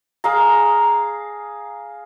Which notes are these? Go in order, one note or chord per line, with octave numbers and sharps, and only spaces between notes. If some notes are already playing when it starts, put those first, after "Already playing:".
G#4 F5 A#5